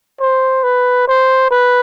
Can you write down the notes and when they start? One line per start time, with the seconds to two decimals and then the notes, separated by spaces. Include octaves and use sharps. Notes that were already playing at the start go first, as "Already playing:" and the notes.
0.20 C5
0.64 B4
1.08 C5
1.51 B4